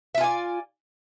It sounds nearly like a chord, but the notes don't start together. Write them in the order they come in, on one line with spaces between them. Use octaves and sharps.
E5 F4 G#5 D5